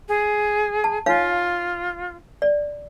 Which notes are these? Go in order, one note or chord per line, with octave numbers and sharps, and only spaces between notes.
G#4
A5
D#4 F4 C#5 F5
D5